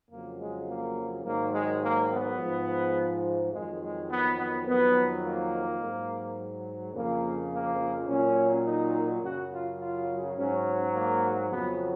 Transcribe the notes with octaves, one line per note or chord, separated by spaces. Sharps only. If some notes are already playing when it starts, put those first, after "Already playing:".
F2 C#3 F#3 A#3
G#3
A#3
G#2 D#3 F#3 A#3
G#3
A#3
B3
G#2 F3
F2 D#3 F#3 G#3
G#3
B3
B3
F2 D#3 F#3 B3
A#3
G#2 F#3
F2 C#3 F3 A#3
A#3
A#2 F#3 C#4
D#4
F#2 C#3 F#3 F#4
F4
F4
G#2 F#3 C#4
A#3
F2 C#3 F#3 B3